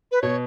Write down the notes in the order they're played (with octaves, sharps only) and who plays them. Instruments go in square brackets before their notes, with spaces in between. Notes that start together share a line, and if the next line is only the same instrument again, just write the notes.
[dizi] B4
[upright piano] B2 [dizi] C#5